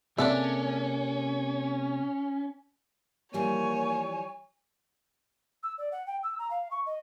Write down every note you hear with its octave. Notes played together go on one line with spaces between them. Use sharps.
C3 A#3 C#4 D4 G#4 A4 E5
E3 F3 G3 A#3 C#5 G#5
E6
D5
F#5
G5
E6
A#5
F5
C#6
D#5